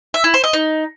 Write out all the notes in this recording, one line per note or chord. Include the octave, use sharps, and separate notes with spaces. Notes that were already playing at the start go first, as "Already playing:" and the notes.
E5
E4
C5
D#5
D#4